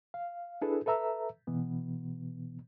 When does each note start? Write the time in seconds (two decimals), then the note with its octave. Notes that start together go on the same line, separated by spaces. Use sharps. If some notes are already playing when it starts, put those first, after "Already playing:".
0.14 F5
0.62 D4 E4 G#4 A4 B4
0.86 A4 B4 E5 A#5 E6
1.47 B2 E3 B3